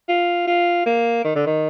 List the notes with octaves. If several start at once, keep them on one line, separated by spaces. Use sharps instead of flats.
F4
F4
A#3
D#3
D3
D#3